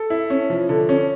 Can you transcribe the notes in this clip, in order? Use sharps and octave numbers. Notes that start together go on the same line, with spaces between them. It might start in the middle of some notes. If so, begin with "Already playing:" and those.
Already playing: A4
E4
C#4
F3
D3
C#4